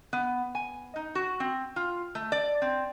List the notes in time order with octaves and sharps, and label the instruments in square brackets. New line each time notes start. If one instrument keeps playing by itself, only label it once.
[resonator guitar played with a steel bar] B3
G#5
D#4
F#4
C4
F4
A3
D5
C4